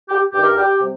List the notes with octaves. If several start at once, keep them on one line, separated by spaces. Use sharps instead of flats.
G4
G2 D#3 G3 G4
A#4
G4
C3 G3